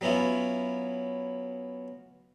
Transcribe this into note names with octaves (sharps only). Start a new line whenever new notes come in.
F#3 B3 C#4 E4 F4